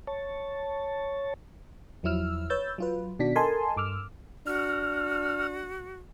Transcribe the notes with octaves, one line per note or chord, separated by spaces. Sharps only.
C#5 A5
E2 F3 F#3 E4 E6 F6
B4 C#5 E6 G6 A6
F#3 F4 B4
B2 D#3 D4 F#4 B6
A4 A#4 D#5 G#5 A5 C6
G2 D6 E6 F6
D4 F#4 F6